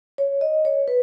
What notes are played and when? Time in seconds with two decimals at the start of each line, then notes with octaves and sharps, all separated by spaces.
0.18 C#5
0.41 D#5
0.65 C#5
0.88 B4